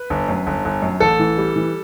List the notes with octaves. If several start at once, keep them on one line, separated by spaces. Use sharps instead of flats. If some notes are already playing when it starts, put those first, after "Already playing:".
Already playing: B4
G1
F#2
G1
G1
F#2
A1 A4
E3
G3
E3